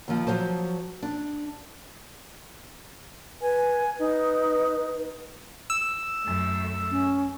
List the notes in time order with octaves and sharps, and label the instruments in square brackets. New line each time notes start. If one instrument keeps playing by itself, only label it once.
[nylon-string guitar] D#2 F3
F3 F#3 C5 A5
D4
[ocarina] B4 [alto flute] G#5
[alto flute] D#4 [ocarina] B4
[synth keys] E6
[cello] F#2 A3
[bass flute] C#4